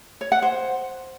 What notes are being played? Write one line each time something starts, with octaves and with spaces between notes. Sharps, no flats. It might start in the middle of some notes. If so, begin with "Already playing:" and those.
C#5
F#5
C5